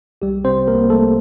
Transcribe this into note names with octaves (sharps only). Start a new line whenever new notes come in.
C2 G3 G4
C3 C4 C5
C2 A#3 A#4
G3 A3 A4